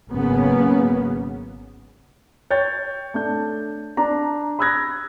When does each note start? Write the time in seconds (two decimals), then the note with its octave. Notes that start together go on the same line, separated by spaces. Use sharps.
0.11 G#1 C#3 F#3 A#3 B3 C#4
2.50 C#5 G5 G6 A6
3.14 A3 D4 G6
3.97 D4 A#5
4.59 B5 D#6 E6 F#6 G#6 A#6